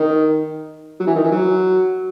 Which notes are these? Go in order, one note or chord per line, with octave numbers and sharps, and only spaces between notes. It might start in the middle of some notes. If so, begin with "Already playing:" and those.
Already playing: D#3
F#3
E3
D#3
E3
F#3